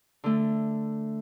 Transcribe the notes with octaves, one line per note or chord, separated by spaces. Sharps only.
D3 A3